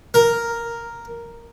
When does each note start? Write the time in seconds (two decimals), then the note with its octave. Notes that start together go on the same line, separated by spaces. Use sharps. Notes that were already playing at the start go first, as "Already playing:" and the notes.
0.14 A#4